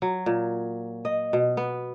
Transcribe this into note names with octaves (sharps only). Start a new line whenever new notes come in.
F#3
A#2
D#5
B2
B3